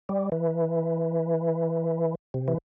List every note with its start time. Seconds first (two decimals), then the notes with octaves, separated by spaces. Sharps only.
0.09 G3
0.32 E3
2.34 C3
2.48 E3